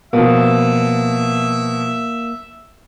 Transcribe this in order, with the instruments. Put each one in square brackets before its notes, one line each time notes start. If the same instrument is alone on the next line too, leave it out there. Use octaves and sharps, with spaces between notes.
[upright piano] B2 F3 [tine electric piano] A#3 [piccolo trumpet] E5